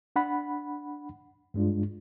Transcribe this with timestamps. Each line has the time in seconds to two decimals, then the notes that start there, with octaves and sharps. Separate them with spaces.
0.16 D4 F#5 B5
1.54 G2 G#3 D4 F4